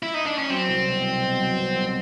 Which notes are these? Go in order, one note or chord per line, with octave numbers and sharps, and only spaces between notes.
E4
D#4
D4
C#4
F#3 C4
C2
B2
B2
B2
F#3
B2
C2